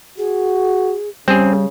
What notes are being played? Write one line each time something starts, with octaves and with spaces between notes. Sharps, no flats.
F#4 G#4
C#3 G3 C4 C#4 G#4